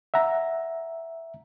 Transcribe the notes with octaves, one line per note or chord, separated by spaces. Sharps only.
E5 F#5 A#5